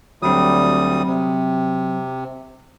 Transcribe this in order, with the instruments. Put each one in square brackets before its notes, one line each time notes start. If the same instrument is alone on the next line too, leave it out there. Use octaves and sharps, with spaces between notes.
[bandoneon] D2 G3 D#6 [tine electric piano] F#3 C4
[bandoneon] C3